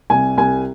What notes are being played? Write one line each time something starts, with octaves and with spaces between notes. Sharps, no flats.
C2 G#5
C2 G#5